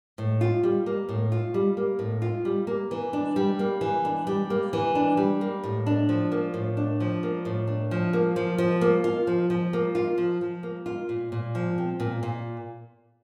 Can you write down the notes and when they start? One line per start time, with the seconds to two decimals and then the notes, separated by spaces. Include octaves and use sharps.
0.18 A2
0.41 F4
0.63 G3
0.86 A#3
1.09 A2
1.32 F4
1.54 G3
1.77 A#3
1.99 A2
2.22 F4
2.45 G3
2.67 A#3
2.91 E3
3.13 D4
3.36 G3
3.59 A#3
3.81 E3
4.05 D4
4.27 G3
4.50 A#3
4.73 E3
4.95 D4
5.17 G3
5.41 A#3
5.63 A2
5.86 D4
6.09 F3
6.32 A#3
6.54 A2
6.77 D4
7.00 F3
7.23 A#3
7.45 A2
7.67 D4
7.91 F3
8.13 A#3
8.36 F3
8.58 F3
8.81 A#3
9.04 F4
9.27 F3
9.50 F3
9.73 A#3
9.95 F4
10.18 F3
10.41 F3
10.63 A#3
10.86 F4
11.09 A#2
11.32 A#2
11.55 F3
11.78 C4
12.00 A#2
12.23 A#2